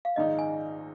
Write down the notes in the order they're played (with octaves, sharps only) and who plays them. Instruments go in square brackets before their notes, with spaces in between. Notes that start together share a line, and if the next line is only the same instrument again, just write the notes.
[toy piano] F5
[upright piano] A#1 G#2 D#3 G#3 D#4 [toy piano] D#5
[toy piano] G#5